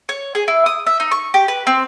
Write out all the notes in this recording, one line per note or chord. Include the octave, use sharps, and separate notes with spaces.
C#5
G#4
E4
D#6
E5
D#4
C#6
G4
B4
C4